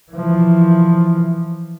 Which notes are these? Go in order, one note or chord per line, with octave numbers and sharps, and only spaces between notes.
E3 F3